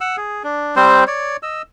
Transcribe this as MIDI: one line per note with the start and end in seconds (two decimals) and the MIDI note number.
0.01 0.16 78
0.01 0.16 88
0.17 0.43 68
0.44 0.75 62
0.76 1.04 55
0.76 1.04 60
0.76 1.04 72
1.07 1.37 73
1.07 1.37 74
1.43 1.62 75
1.43 1.62 88